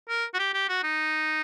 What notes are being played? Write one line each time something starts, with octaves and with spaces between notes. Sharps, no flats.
A#4
F#4
G4
G4
F#4
D#4